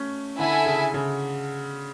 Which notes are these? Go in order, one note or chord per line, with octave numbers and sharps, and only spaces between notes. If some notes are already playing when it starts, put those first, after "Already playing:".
Already playing: A3 C#4
D3 E4 A4 E5 G#5
C#3
C#3